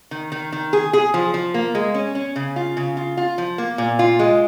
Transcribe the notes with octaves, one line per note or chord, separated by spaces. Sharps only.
D#3
D#3
D#3
G#4
G#4
F3
F3
A#3
G#3
C#4
C#4
C#3
F4
C#3
F4
F4
F3
A#3
A#2
F4
G#3